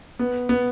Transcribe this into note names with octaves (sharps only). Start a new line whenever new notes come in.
B3
B3